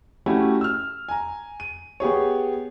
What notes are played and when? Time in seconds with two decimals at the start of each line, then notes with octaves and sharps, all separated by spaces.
0.26 A3 C#4 E4 F#4 G4
0.61 E6 F6
1.09 G#5 A#5
1.60 D#7
2.00 B3 G4 G#4 C#5